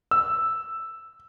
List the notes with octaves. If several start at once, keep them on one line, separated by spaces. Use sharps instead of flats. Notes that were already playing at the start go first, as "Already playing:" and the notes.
E6